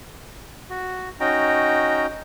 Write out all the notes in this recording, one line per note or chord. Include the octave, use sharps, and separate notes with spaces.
F#4
C#4 D#4 F#4 G5 A#5